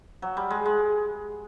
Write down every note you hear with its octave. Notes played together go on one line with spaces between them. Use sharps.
F#3
G3
G#3
G#3